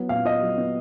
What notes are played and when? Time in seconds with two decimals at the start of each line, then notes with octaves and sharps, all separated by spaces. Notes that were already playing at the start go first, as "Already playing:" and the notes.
Already playing: F#3 B3
0.09 A#2 F5
0.25 F4 D#5
0.42 F#3
0.58 B3